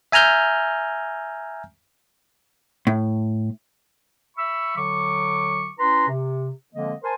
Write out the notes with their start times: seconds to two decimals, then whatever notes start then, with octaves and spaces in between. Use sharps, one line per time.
0.12 E5 G#5 A#5 F6 G6
2.87 A2
4.36 E5 B5 C#6 E6
4.76 D3 F#3 C#6 D6
5.78 C#4 E4 B4 A#5 C6
6.08 C3
6.74 D3 F3 G#3 A#3 C4 D#5
7.03 A#4 C5 G#5 A5 C6